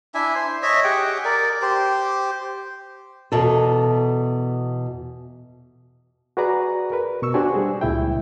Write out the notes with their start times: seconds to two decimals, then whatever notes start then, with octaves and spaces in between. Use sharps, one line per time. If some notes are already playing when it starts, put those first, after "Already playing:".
0.14 D4 E4 E5 G#5
0.35 C5 C6
0.62 C#5 D#5 E5
0.84 G4 G#4 F#5 G5
1.25 A#4 D5
1.62 G4 C5
3.32 E2 B2 A4
6.37 F#4 G#4 B4 D5 A#5
6.92 A#4 B4
7.22 B2 C#6 E6
7.34 D4 F#4 G4 C5 D5 G#5
7.54 G3 G#4
7.81 C#2 A#2 E4 E5 G5